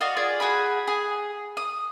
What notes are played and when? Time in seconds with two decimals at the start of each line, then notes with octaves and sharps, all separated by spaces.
0.01 F#4 D5 D#5 F5
0.17 F4 G#4 D5
0.40 F#4 G#4 G#5 B5
0.88 G#4
1.57 D#6